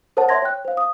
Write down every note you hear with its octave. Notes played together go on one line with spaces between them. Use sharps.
A#4 C5 C#5 F#5 A5
C#5 E5 C6 G#6 A#6
C#5 G5 F#6
C5 F5
D#6